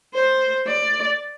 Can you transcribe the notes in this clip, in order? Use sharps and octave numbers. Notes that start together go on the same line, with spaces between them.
C5
D5